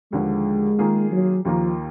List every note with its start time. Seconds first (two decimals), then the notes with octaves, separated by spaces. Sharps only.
0.12 D#2 D3 F3 G#3
0.79 D#3 A#3 F4 G#4
1.12 F#3
1.45 D#2 D#3 F3 A#3 F4